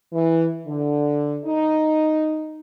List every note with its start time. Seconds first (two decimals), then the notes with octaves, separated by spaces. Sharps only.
0.12 E3
0.66 D3
1.44 D#4